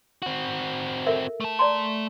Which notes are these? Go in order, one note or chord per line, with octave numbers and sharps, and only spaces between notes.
C4 F#4
A4 A#4 E5
A3 A5
D5 A#5 C6